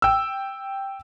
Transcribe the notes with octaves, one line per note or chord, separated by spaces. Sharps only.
G5 E6